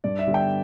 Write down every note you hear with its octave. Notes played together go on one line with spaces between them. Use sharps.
G2 D5
E5
D3 G3 B3
G5